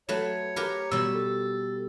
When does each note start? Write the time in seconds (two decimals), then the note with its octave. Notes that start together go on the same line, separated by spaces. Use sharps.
0.09 F#3 A3 B4 C#5
0.56 G4 A#4 B4
0.91 B2 G3 E6
1.15 A4